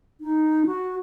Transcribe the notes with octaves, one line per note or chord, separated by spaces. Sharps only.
D#4
F#4